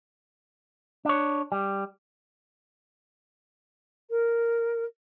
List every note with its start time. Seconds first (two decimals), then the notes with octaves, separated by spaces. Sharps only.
1.05 D4 C#5
1.52 G3
4.10 A#4